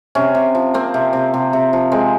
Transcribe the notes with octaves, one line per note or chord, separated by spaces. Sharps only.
C3 C#4
C3
F3
A#3 C4
C3
C3
C3
C3
F3
G#3 C4